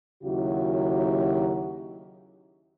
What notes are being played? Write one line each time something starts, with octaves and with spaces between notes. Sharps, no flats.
D#2 C#3 F#3 E4 F#4 G4